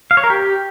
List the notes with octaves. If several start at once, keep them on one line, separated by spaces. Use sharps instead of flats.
F5
C#5
A#4
G4